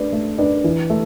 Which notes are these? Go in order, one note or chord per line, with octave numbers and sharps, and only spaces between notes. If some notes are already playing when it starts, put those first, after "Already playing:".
Already playing: A3 D4 B4 D5
A3
D4 B4 D5
E3
A3